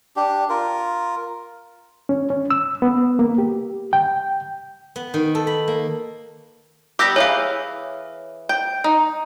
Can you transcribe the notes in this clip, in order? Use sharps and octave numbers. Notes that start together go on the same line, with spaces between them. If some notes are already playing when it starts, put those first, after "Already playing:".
D4 G4
F4 A#4
C#4
C#4
E6
B3
A#3
G4
G5
B3
D#3
A4
B5
A#3
G3 B3 G4 D6 E6 A#6
E3 G#4 C#5 F5
G5
D#4